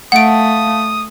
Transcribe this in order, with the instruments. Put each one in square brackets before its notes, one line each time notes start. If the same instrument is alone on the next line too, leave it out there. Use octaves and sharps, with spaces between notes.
[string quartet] A3 [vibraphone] F5 A5 [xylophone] F#5 D7 [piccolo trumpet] D#6